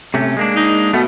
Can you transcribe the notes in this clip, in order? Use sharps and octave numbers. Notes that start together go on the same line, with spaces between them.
C3 A3 C#4
G#3 A#3 D4
D#4
B2 A3 B3